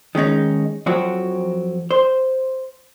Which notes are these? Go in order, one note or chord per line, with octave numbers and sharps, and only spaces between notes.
D#3 G#3 C#4 D#4
F2 F3 F#3 C4 F#4
C5